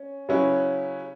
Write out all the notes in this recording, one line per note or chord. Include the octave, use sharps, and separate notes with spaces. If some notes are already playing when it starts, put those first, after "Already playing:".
Already playing: C#4
C#3 F#3 C#4 E4 B4